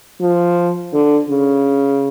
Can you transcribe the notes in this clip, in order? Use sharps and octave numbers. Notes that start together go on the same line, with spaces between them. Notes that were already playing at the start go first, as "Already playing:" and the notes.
F3
D3
C#3